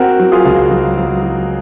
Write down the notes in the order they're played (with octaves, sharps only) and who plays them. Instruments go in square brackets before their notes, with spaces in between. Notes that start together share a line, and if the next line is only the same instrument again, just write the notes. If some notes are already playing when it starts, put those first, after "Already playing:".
Already playing: [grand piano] C4 [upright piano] F#4 A#4
[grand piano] F#3
[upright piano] F4 G#4
[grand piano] C#2
F#3
F#3
F#3